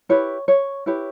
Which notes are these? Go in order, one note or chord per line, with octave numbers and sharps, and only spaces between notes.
E4 G4 B4 C#5
C#5
E4 G4 B4 C#5